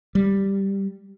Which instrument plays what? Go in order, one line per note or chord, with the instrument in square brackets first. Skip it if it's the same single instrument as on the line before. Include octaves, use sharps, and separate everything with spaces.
[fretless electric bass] G3